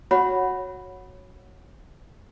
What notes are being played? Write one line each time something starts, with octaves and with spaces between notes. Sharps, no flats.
F#4 C#5 F#5 B5